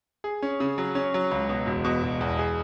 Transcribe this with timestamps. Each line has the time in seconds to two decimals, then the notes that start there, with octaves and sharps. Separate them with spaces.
0.24 G#4
0.42 C#4
0.60 C#3
0.78 F#3
0.95 C#4
1.14 F#3
1.31 C#2
1.49 B2
1.67 E1
1.84 B2
2.03 E1
2.21 E2
2.39 G#4